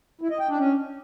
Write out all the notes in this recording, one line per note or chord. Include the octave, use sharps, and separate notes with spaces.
E4
D#5
G5
D4
C#4